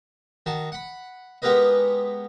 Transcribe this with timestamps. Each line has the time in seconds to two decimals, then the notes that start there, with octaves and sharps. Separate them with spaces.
0.46 D#3 F#4 A5
0.72 F#5 B5
1.42 G#3 B3 G4 A#4 B4 D#5